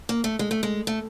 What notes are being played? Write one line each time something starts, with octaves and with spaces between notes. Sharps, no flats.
A#3
A3
G#3
A3
G#3
A3